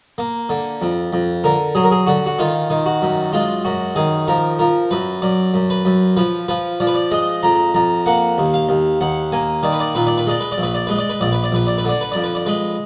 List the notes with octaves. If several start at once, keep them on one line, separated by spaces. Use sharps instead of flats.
A#3
D3
F2
F2
D3 A#4
F#3 G#4
A#4
G#4
D3 F#4
F#4
D#3 F4
D#3
F#4
F#2
G#3 F4
F#2 F#4
D#3 G#4
F3 A#4
F3 A#4
F#2 B4
F#2 D5
F#2
B4
F#2
F3 B4
F3 B4
F3 D5
B4
D5
G#3 D#5
F2 A#5
F2 A#5
A#3 F#5
D#2
F5
D#2
D#2 F#5
A#3 G#5
D#3 D5
B4
D5
A#2 B4
D5
B4
G#3 D5
B4
D5
A#1
B4
D5
G#3 B4
D5
B4
A#1 D5
B4
D5
A#1 B4
D5
B4
D3 D5
B4
F2 D5
B4
D5
G#3 B4